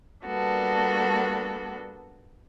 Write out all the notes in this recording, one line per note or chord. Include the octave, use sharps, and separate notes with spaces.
G3 A#3 B3 D4 F#4 A4